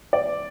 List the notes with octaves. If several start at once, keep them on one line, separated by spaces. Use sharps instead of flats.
D5